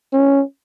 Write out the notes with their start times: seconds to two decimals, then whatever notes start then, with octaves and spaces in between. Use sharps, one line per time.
0.13 C#4